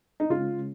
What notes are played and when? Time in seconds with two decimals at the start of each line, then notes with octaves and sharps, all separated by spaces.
0.20 D#4
0.30 C#3 G#3 C#4 F4